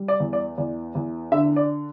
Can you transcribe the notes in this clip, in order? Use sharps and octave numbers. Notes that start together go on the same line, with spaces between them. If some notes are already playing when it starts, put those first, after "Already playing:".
Already playing: G3
D5
E2
D5
E2 D5
E2
D3 E5
D5